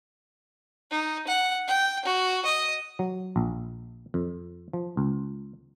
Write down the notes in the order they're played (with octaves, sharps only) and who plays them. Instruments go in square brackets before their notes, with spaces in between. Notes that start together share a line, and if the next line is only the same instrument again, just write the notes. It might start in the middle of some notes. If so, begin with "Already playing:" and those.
[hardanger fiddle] D#4
F#5
G5
F#4
D#5
[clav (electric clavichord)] F#3
A#1
F2
F3
C#2